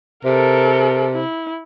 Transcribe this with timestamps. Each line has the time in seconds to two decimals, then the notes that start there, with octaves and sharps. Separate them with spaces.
0.25 C3 A4 A#4
1.14 E4